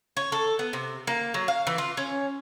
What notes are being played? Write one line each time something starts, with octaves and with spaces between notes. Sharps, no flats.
C#5
A4
B3
C3
A#3
F#3
F5
E3
F4
C#4